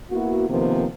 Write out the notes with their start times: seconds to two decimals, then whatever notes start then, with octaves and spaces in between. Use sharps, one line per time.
0.11 A#3 B3 E4 F#4
0.49 C3 D#3 F3 A#3 B3